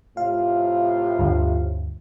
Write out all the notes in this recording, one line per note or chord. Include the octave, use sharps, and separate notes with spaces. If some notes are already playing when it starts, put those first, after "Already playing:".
A2 C3 F4 F5
D2 G2